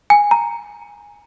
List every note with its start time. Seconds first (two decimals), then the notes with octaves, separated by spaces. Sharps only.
0.10 G#5
0.31 A#5